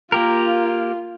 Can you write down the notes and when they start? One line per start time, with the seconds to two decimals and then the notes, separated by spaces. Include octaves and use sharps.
0.12 A#3 F4 G4 A#4